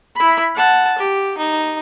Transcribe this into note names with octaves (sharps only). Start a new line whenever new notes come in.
E4 B5
F#5 A5
G4
D#4